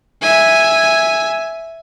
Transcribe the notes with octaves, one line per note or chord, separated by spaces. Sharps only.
E5 G#5